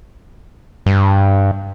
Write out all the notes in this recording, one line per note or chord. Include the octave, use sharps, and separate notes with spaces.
G2